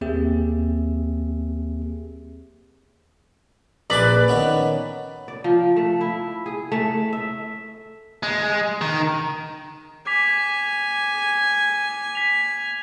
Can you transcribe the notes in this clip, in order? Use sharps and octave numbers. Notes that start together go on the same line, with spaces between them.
D#2 A#3 C4 G4 G#4 E5
A#1 A4 B4 D5 G#5
D#3 B3 C#4
D5
F3
A3
E4
G#4
A3
E5
G#3
D#3
G#5 D6 B6 F7
B6 F7